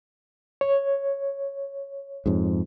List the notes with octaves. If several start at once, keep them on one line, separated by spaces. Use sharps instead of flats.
C#5
F2 G#2